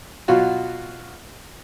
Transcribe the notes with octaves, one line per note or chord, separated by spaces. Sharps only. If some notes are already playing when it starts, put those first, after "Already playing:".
B2 F#3 F4 F#4